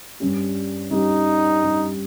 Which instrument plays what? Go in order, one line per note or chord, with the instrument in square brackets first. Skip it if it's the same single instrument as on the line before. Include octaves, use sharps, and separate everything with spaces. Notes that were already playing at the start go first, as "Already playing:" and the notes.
[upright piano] G2 G3 C#4 G4
[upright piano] G2 G3 C#4 G4 [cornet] D#4
[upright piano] G2 G3 C#4 G4